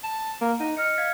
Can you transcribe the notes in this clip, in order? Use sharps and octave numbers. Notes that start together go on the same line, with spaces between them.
A5
A#3
D#4 F#5
D#5 F6 C#7
F5 G#6 B6